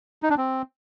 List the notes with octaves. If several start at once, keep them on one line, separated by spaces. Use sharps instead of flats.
D#4
D4
C4